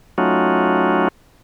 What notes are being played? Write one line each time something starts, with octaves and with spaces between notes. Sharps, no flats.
F#3 A3 C#4 D#4 F4 F#4